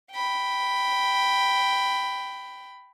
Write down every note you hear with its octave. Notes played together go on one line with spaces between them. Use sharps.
G5 B5